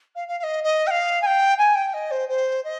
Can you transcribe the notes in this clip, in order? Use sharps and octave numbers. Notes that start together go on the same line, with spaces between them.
F5
F5
F5
D#5
D#5
G5
F5
G#5
G5
G#5
G5
D#5
C5
C5
D#5